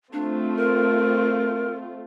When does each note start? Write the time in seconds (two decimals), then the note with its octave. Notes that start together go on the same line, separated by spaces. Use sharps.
0.13 A3 C4 D4 F4
0.57 A#4